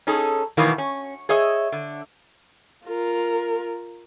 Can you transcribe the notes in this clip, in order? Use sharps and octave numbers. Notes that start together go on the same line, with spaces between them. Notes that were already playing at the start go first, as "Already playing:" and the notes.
C#4 D#4 G#4 A4
B2 D#3 E3 F#3 A3 A#3
C#4
G#4 C#5 D#5 E5
D3
F4 A#4